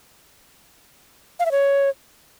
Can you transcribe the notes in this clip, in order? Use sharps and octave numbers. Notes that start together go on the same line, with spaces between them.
F5
E5
C#5